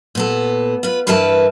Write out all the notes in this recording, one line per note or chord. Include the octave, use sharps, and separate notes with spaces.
A#2 B3 A4
F4 B4
G2 E3 A#4 B4 E5 A5